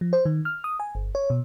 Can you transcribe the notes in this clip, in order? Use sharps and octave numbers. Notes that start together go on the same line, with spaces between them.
F3
C5
D#3
F6
D#6
G#5
G1
C#5
B2